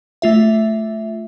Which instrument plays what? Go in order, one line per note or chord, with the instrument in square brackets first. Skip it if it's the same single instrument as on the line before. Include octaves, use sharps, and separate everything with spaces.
[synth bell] A3 F4 E5